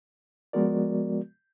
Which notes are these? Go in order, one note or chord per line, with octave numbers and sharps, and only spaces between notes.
F3 G#3 B3 F#4 A#4 D5